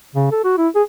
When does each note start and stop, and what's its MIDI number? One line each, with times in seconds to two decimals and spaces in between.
0.15 0.27 49
0.32 0.39 69
0.44 0.57 66
0.57 0.68 64
0.75 0.82 68